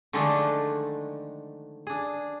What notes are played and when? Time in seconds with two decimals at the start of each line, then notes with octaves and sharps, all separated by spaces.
0.13 D3 D#3 F3 G#3 A3 D4
1.87 D4 G#4